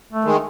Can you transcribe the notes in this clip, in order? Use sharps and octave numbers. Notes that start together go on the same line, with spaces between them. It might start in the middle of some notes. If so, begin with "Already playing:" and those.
A3
D#3 G#3